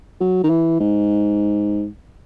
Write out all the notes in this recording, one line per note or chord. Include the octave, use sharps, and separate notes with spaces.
F#3
D#3
E3
G#2